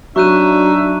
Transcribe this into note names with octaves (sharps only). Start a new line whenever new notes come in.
F#3 D4 D#4 E5 C#6 F#6 D#7